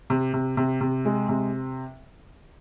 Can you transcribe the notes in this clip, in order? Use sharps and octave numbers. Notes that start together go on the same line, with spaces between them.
C3
C3
C3
C3
G#3
C3